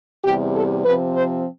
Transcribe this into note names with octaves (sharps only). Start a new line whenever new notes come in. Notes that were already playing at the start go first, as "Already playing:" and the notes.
E2 C3 G3 G4
A4
C3 F3 C4 B4
C5